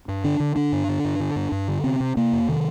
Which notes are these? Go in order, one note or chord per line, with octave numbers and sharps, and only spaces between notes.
G2
D3 D4
D3
D3 D4
G2
D3
G2
D3
G2
G2
D3
C3 C4
C3
C3 A#3
F2
C3 D#3